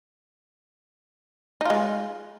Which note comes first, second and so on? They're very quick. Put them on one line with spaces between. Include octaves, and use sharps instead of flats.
D#4 F4 G#3